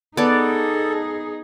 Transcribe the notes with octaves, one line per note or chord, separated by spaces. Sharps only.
B3 D#4 G#4 A4 D5